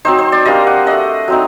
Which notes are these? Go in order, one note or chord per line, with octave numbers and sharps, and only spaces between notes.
F#3 C4 D#4 C5
C5
D5
G3 A#3 D4 D#5
F#5
A3 D4 D#5
F#3 C4 D#4